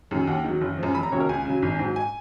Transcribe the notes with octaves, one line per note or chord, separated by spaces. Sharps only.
F#2 D#3 F#3
D#2 F#5
D#3 F#3
F#1
F#2 F3
F1 B5
A#5
D#2 C#3 F#3 C#5
A#4
C#2 G#5
C#3 F#3
G#1
G#2 F#3
G#5